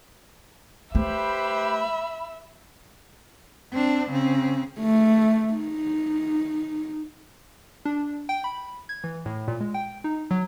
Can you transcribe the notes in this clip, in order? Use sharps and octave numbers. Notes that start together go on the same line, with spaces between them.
A3 G4 B4 C5 E5 B5
C4 D4
C#3 C4
A3
D#4
D4
G5
B5
G#6
E3
A2
A#2
G#3
G5
D#4
F#3